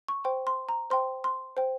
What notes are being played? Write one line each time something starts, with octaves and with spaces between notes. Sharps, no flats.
C#6
C5 G5 C6
C6
A#5
C5 G5 C6
C6
C5 G5